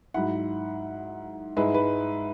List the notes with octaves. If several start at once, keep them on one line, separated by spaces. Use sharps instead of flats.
G#2 F#3 E4 F#5 B5
G#2 G#3 E4 B4 E5
B4